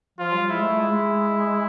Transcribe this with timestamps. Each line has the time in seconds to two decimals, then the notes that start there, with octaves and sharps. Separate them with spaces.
0.19 F3 F4
0.34 G3
0.50 G#3 E4
0.64 A3
0.80 G#3